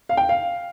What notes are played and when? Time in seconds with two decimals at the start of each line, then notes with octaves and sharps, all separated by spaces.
0.09 F5
0.17 G5
0.29 F5